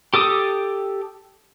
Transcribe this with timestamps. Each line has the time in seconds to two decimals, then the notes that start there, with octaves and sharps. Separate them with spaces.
0.14 G4 A4 D6 D#6